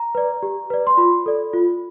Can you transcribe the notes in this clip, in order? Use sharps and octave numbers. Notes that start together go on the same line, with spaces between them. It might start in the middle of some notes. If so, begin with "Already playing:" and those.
Already playing: A#5
B4 D5
G4
B4 D5
C6
F4 B5
A4 D5
F4